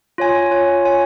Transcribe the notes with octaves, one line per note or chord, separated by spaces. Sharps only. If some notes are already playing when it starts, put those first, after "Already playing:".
F4 C#5 G#5
F4 C#5 G#5
F4 C#5 G#5